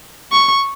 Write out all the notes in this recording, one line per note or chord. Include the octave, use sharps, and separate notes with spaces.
C#6